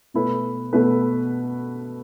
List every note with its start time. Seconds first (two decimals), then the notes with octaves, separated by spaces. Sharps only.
0.14 B2 A3 E4 B4
0.73 B2 A3 E4 B4